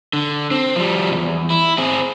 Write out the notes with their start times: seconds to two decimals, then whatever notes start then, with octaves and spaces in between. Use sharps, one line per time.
0.13 D3
0.51 C4
0.76 F3 G3
1.11 B1 E2
1.50 E4
1.78 C4 G#4